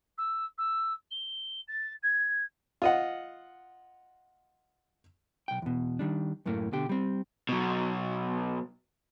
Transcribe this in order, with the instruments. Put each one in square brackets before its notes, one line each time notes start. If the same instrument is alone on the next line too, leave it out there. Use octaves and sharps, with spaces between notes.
[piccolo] E6
E6
G7
A6
G#6
[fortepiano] F4 D#5 F#5
[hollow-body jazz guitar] B1 G5
E2 B2
D#3 G3 D4
F#2 A2 A3 A#3
B2 D3 G4
G3 C4
[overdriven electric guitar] B2 F#3